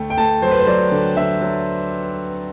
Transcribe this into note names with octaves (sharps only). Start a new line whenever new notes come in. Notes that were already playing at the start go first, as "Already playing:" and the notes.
Already playing: D2 A3 G5
G5
A3 A5
F#3 C5
B4
C5
F#3 D5
D3
D3 E5
F#3